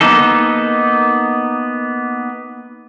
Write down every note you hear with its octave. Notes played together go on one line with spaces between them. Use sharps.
A#3 B3 D#4 A4